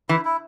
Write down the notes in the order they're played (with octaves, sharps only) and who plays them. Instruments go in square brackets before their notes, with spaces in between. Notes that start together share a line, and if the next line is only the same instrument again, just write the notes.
[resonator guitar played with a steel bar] E3 [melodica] E4
[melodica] E4